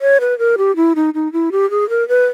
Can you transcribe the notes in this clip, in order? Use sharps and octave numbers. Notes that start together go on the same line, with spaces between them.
C#5
B4
A#4
G4
E4
D#4
D#4
E4
G4
G#4
A#4
B4